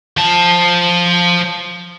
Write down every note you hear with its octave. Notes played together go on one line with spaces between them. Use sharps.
F3 A5